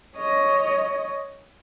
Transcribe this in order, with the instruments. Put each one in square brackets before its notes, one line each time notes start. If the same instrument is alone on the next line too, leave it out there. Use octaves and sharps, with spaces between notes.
[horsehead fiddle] C#5 D#5